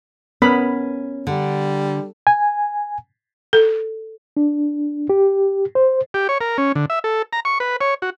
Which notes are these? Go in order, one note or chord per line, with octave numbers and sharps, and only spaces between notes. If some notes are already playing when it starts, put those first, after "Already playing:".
B3 C#4 A#4 B5
D3 G3
G#5
A4
D4
G4
C5
G4
C#5
A#4
C#4
D3
E5
A4
A#5
C#6
B4
C#5
F#4